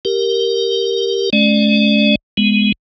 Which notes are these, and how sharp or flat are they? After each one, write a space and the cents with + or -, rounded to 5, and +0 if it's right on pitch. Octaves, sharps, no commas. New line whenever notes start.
G4 +0 A#4 +0
G#3 +45 C#4 +10 D5 +20
G#3 +0 B3 +0